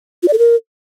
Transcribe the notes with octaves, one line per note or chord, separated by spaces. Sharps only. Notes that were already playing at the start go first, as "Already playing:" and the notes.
F4
D5
A4
A#4